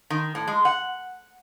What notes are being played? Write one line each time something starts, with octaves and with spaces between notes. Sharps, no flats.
D#3
A2
G#3
F#5